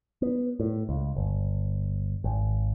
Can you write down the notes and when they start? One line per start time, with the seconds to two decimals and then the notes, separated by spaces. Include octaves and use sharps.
0.22 B3
0.60 A2
0.89 C#2
1.16 G1
2.24 G#1